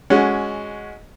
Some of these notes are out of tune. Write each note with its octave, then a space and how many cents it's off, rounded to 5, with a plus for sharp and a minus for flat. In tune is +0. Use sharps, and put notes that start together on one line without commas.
G#3 +0 C#4 +10 F#4 -10